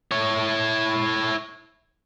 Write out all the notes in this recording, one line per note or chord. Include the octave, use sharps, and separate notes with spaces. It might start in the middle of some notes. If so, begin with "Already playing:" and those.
E4 C#5